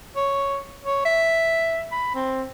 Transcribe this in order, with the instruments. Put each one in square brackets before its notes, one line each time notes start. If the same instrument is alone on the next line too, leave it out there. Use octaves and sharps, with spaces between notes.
[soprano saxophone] C#5
C#5
E5
B5
C4